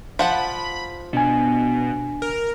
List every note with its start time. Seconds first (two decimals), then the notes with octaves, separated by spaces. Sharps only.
0.19 F3 F#5 A5 B5
1.13 B2 D4 G#5
2.22 A#4